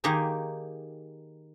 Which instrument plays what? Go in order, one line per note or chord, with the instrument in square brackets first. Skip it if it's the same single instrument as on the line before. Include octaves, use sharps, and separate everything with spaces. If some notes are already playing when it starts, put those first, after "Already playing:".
[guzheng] D#3 A#3 D#4 G4 G#4 A#5